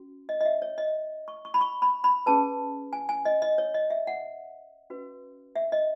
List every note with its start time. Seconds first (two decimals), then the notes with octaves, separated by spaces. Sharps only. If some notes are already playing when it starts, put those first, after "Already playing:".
Already playing: C#4 F#4
0.29 D#5
0.41 D#5
0.45 E5
0.62 C#5
0.78 D#5
1.28 C#6
1.45 C#6
1.54 B5
1.61 C#6
1.82 B5
2.04 B5
2.26 C#4 G#4 B4 A5
2.93 G#5
3.09 G#5
3.25 D#5
3.42 D#5
3.58 C#5
3.74 D#5
3.90 E5
4.07 F#5
4.90 C#4 F#4 B4
5.56 E5
5.72 D#5